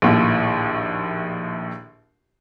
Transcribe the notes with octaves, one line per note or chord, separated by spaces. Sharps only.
A#1 D#2 A2